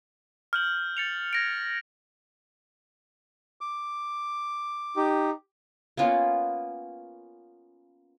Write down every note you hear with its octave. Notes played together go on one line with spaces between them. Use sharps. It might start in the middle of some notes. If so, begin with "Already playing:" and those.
F6 G6 F#7
A6 C#7 F7
G#6 A#6 D7
D6
D#4 G4
A#3 B3 C#4 F4